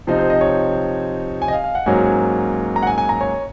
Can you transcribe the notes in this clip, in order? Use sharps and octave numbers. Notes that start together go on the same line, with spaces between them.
C3 F3 C4 D#4
C5
D#5
C#5
G#5
D#5
F5
F5
F#5
G#2 F#3 A#3 C#4 G#5
A#5
F#5
G#5
G#5
A#5
C#5